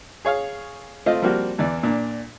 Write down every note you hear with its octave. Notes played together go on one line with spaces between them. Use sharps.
G#4 C#5 F5
A3 C4 F4 D#5 F5
F3 G3 A#3 C4 F#4
E2 E3 D5
A#2 D4